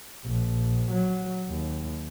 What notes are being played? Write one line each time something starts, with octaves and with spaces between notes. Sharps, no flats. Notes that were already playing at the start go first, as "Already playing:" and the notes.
A#1
F#3
D#2